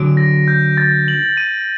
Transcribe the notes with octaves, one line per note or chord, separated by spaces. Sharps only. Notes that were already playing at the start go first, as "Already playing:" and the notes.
Already playing: D3 F#3 D7
A#6
G6
A6
F#7
D#7